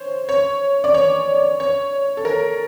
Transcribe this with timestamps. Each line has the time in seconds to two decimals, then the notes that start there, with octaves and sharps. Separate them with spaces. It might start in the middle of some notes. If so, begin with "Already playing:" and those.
Already playing: C5 C#5
0.29 C#5
0.84 D5
0.94 C#5
1.60 C#5
2.17 A4
2.25 A#4